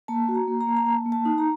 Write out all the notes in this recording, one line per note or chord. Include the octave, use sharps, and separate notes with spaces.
A#3 A5
F#4
A#5
A#3
A#5
A#3 A5
A#5
A#3 A5
A#3
A5
D#4
A#5